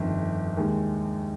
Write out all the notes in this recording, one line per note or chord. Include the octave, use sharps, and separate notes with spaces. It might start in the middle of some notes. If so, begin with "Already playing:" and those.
Already playing: G1 F2 D#3
D#2 D#3 G#3